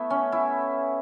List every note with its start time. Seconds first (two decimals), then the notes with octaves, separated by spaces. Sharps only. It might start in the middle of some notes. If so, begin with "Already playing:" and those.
Already playing: A3 B3 E4
0.10 C#4
0.32 E4